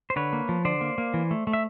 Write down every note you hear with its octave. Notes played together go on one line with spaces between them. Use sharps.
C5
D3 B4 C#5
A#3
F3
D3 C5 D5
A#3
A#3
E3
A3
A3
E5